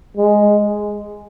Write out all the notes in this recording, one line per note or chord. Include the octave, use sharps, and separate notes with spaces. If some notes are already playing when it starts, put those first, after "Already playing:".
G#3